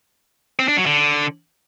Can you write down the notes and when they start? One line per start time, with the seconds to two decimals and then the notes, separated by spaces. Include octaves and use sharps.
0.59 C4
0.68 D4
0.77 F#3
0.86 D3